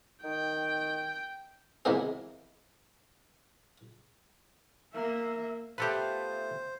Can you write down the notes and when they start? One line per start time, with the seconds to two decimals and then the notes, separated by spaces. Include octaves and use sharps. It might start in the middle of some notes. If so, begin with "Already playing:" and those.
0.24 D#3 G5
1.85 C3 E3 G#3 A#3 B3 G#4
4.94 A#3 E5
5.78 A3 B3 F4 G4 A4 B4 C5